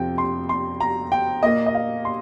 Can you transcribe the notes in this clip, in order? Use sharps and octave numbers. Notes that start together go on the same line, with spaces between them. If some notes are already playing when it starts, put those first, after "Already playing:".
Already playing: F2 C3 F3 G5
C6
C6
A#5
G5
A#2 A#3 D#5
D#5
F5
C6